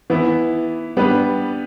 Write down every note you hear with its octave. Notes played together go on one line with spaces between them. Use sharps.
E3 B3 E4
G3 B3 D4 B4